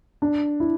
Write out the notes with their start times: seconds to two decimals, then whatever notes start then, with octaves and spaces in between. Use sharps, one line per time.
0.22 D4
0.60 E4